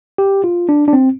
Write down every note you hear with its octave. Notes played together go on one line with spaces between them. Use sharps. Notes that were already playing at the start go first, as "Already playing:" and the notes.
G4
F4
D4
D4
C4